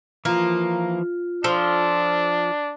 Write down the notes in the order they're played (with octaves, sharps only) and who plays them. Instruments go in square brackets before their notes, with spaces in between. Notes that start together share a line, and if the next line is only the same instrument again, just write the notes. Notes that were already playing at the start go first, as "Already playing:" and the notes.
[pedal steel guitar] E3 F3 [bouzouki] A#3 [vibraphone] F4
[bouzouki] F3 [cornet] D4 [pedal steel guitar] A4 C6